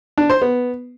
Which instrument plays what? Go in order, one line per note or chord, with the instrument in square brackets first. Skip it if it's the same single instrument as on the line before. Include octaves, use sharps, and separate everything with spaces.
[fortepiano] D4
C5
B3